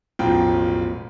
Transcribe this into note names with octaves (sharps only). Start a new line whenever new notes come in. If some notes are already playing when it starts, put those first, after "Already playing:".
E1 A1 B2 F3 F4 G5